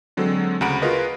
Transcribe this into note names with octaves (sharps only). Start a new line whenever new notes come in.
D3 F#3 G#3 C4 A4
D2 C#3 F#5 A#5 B5 D7
F4 F#4 G#4 A#4 B4 D#5